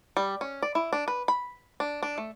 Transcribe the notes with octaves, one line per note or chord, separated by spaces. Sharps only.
G3
C#4
D5
E4
D4
B4
B5
D4
D4
A3